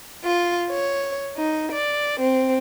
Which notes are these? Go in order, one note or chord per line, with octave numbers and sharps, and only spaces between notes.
F4
C#5
D#4
D5
C4